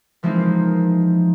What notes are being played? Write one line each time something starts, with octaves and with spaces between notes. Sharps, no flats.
E3 F3 G#3 A#3 C4 D#4